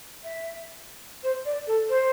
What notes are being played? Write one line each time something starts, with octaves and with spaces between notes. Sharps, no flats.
E5
C5
D5
A4
C5